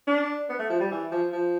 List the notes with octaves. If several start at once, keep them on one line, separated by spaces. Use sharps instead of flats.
D4
B3
A3
F3
G3
E3
F3
F3